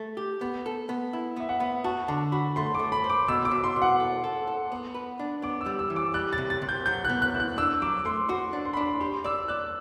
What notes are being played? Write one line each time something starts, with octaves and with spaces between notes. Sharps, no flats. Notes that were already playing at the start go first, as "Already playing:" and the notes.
Already playing: A3
G4
B3
A4
B3
E4
B3 E5
F#5
B3
F#4 A5
D3 A5
F#4 B5
A3 C6
D6
A3
B5
C5
D6
B2 E6
D6
B2
C6
B2
F#5
A4
A4
A4
B3
B4
D4
B3 D6
E6
G3
E6
E3
D6
G3 F#6
A6
C3
A6
C3
G6
F#3 G6
F#6
B3
F#6
E4
F#6
D4 E6
F#3 D6
A3 C6
F#4 C6
D4
C6
B5
D4 C6
G4 C6
D5 E6
D5 F#6